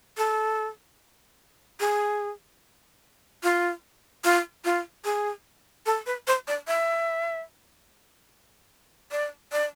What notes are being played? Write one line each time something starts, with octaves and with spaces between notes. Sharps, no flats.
A4
G#4
F4
F4
F4
G#4
A4
B4
C5
D5
E5
D5
D5